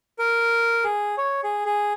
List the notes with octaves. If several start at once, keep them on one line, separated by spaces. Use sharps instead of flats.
A#4
G#4
C#5
G#4
G#4